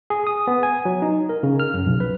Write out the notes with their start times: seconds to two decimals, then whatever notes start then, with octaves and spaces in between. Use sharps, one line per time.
0.10 G#4
0.27 D#6
0.47 B3
0.63 G#5
0.85 F#3
1.02 D#4
1.29 A#4
1.43 C#3
1.60 F6
1.74 F#2
1.86 B1
2.00 B4